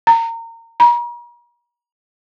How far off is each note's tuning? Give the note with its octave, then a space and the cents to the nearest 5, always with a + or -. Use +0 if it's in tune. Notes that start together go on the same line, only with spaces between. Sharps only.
A#5 -30
A#5 +40